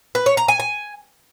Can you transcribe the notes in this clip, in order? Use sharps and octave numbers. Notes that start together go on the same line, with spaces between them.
B4
C#5
A#5
G#5
G#5